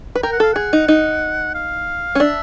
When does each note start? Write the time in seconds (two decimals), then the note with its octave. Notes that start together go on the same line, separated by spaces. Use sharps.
0.15 B4
0.23 A#4 G5
0.32 F#5
0.40 A4 F5
0.53 G#4 F#5
0.73 D#4
0.88 D#4
1.55 F5
2.15 C#4
2.20 D4 E5